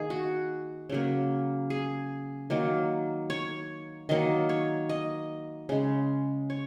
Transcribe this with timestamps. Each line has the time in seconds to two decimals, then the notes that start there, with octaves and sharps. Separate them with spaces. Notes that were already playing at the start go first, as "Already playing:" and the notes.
Already playing: D#3 A#3 G#4
0.10 F#4
0.89 C#3 F#3 A#3
1.70 G#4
2.50 D#3 F#3 A#3
3.30 C#5
4.09 D#3 F#3 A#3 D#5
4.49 C#5
4.89 D#5
5.69 C#3 G#3
6.50 C#5